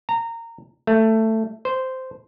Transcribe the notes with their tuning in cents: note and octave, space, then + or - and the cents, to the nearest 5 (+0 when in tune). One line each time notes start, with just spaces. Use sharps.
A#5 -20
A3 +10
C5 -10